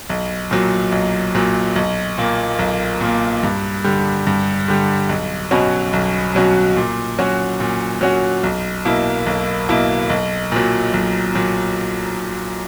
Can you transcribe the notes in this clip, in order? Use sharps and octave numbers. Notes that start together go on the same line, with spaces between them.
B1
A#2 F#3
B1
A#2 F#3
B1
A#2 A#3
B1
A#2 A#3
G2
D3 G3
G2
D3 G3
B1
B2 F#3 C#4 F#4
B1
B2 F#3 C#4 F#4
A#2
F#3 C#4 F#4
A#2
F#3 C#4 F#4
B1
B2 A#3 E4
B1
B2 A#3 E4
B1
A#2 F#3
B1
A#2 F#3